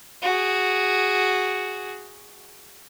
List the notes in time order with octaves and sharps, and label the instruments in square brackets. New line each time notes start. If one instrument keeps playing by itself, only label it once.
[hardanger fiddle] F#4 G#4